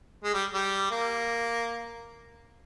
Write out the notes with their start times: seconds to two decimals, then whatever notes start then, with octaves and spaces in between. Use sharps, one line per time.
0.24 G#3
0.34 G3
0.54 G3
0.91 A#3